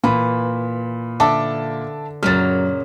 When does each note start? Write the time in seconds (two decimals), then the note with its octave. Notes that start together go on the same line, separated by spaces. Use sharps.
0.04 A#2 E3 B5
1.20 D3 D4 E5 A5 D6
2.23 F#2 A#2 C#3 F#3 F6 A6